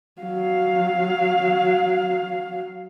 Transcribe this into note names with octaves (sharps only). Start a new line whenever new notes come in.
F#3 F5